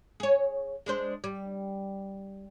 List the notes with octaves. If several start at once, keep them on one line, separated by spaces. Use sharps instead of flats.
G#4 C#5
G#3 D4 C5
G3